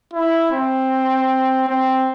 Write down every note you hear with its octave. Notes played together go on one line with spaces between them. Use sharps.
E4
C4
C4